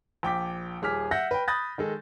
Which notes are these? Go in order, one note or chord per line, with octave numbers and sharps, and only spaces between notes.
A#1 G5 D6 B6
D#1 G#4 D6 F6 B6
E5 F#5 G6 A#6
B4 G5
B5 D#6 F#6 G6 A6 A#6
D#3 G#3 A4